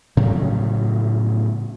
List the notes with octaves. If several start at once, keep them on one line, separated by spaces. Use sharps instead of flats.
A2 C#3 F#3 G3